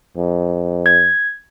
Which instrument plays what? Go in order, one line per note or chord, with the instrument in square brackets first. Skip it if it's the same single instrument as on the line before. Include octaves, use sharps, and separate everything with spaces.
[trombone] F2
[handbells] G#6